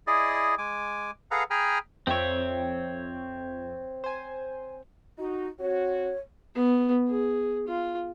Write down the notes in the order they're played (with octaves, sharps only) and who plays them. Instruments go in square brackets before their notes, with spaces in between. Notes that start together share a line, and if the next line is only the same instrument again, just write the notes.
[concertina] E4 G#4 D5 D#5
G#3 G#5 D6
G#4 A4 B4 F5 F#5 A#5
G#4 G5 G#5 A#5 B5 F6
[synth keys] F2 E5 G5 [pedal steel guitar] C4 C#5
[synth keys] C5 G#5
[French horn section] D#4 [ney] F#4
[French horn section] C4 F#4 [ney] C#5
[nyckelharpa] B3
G#4
F4